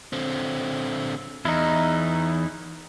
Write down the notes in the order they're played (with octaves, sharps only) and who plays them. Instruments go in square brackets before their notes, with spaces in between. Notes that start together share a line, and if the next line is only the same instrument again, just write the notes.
[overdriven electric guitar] D3 C4
[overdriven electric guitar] E2 [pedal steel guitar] D#4 E4